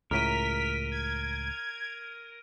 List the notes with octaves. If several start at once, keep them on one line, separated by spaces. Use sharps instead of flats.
C#2 A2 A#4 F6 B6 D7 D#7
G#6